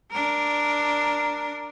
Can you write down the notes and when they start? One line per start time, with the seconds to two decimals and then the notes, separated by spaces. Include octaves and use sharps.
0.12 D4 A#4